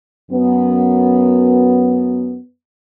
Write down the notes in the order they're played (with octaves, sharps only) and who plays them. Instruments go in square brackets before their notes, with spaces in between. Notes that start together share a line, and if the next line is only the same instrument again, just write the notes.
[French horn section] F#2 B3